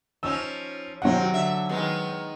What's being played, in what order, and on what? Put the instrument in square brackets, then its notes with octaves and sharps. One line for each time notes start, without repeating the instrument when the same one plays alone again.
[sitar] F3 C#4 D#4 [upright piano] E6
[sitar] C3 D#3 C4 [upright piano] F#3 F#5
[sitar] D3 E5
D#3 G#3 B3